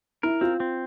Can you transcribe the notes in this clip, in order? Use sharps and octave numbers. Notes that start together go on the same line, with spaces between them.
E4 A#4
C4 F4
C4